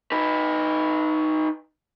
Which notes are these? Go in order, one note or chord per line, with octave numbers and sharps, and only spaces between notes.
D#4 B4